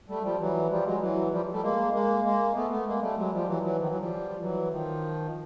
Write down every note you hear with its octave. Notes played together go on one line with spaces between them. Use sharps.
G3 A3
F3 G3
E3 F#3
F3 G3
F#3 G#3
E3 F#3
F3 G3
G3 A3
G#3 A#3
G#3 A#3
G#3 A#3
A3 B3
A3 B3
G#3 A#3
G3 A3
F#3 G#3
F3 G3
E3 F#3
E3 F#3
D#3 F3
E3 F#3
F3 G3
E3 F#3
D#3 F3